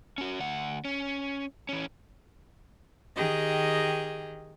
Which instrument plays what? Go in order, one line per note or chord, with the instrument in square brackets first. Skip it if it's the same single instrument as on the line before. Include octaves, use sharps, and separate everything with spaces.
[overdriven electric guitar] C#4 F#4
D2 F#5
C#4
E3 C#4
[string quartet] D#3 G4 G#4 D#5